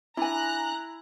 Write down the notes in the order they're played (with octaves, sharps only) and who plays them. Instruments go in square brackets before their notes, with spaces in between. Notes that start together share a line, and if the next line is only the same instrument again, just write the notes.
[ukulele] D4 G#5 [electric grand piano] E4 [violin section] A#5 F#6